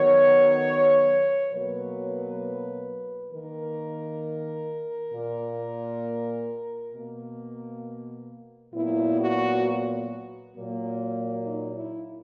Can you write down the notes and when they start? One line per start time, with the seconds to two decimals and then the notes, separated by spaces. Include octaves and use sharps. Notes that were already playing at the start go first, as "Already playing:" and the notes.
Already playing: D#3 F#3 B3 C#5
1.51 B2 F#3 A#3 B4
3.32 D#3 A#3 A#4
5.13 A#2 A#3
6.94 B2 A#3
8.74 A#2 F#3 B3 E4
9.19 F#4
10.55 A#2 F#3 A#3
11.45 D#4
11.75 E4